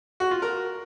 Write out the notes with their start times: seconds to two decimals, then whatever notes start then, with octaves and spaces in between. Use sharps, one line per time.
0.20 F#4
0.31 F4
0.42 A#4